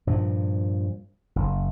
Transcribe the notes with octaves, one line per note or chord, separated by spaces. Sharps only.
G2 A#2 F3
F#1